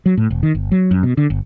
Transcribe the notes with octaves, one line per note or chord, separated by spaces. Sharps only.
F#3
A2
E1
D#3
G1
F#3
F#2
B2
D3
G1